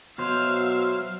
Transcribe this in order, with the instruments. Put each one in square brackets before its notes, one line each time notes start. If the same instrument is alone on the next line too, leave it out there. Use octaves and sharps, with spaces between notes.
[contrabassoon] B2 [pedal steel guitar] F#3 C5 [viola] E5 F5